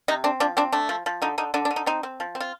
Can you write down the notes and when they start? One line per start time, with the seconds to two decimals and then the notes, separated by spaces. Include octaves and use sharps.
0.08 C3 D#4
0.24 C4 D4
0.40 F3 D4
0.57 C4 D4
0.72 A3 D4
0.89 F3
1.06 F3
1.22 D3 D#4
1.38 D3 D#4
1.54 D3 D4
1.65 D4
1.71 D3
1.76 D#4
1.86 C4 D#4
2.03 C4
2.20 F3
2.35 C4
2.40 F4